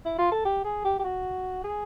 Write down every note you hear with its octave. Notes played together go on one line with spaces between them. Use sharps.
E4
F4
A4
G4
G#4
G4
G4
F#4
G#4